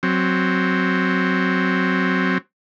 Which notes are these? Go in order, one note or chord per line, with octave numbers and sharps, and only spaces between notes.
F#3 C4